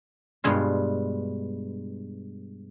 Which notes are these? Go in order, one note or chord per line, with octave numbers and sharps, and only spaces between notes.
G2 B2 G#3 F4